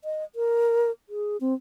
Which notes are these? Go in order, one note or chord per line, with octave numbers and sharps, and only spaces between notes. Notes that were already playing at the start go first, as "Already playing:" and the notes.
D#5
A#4
G#4
C4